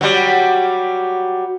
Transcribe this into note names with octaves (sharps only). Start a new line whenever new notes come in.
F#3 G3